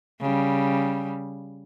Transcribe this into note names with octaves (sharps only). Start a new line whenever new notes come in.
C#3 G3